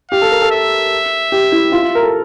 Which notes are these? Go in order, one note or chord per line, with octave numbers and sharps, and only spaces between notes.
G4 F5
A4
A#4
A4
E5
G4
E4
F4
F4
A#4
A4